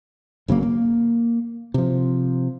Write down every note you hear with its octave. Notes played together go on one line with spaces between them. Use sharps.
G1 C#3 F#3 A#3
A#3
C3 F3